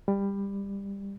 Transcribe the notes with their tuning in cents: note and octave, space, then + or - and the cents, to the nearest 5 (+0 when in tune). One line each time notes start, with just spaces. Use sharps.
G3 +20